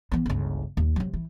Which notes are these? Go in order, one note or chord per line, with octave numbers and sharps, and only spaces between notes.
E3 B3
G1 C#2
D#2
C3 F#3
E3